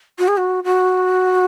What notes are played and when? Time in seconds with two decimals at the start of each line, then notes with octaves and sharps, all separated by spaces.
0.19 F#4
0.28 G#4
0.37 F#4
0.64 F#4